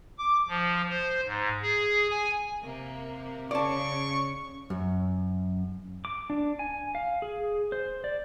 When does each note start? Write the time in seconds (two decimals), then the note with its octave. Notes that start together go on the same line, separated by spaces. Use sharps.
0.18 D6
0.48 F3
0.89 C5
1.26 G#2
1.62 G#4
2.10 G#5
2.61 C3 A#3
3.51 C#3 C#5 D5 A5 C#6
4.70 F#2
6.05 D6
6.30 D4
6.59 G#5
6.95 F5
7.22 G#4
7.72 C5
8.04 D5